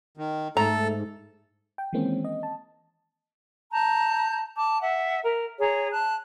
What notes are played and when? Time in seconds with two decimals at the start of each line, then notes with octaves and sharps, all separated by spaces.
0.17 D#3
0.57 G#2 A3 A4 A#5
1.78 G5
1.93 D#3 E3 G#3 A#3 C4 C#4
2.25 D#5
2.43 A5
3.72 A5 A#5 G6
4.56 A5 D6
4.82 E5 F#5
5.23 A#4
5.59 G#4 C#5 A#5
5.91 A5 F#6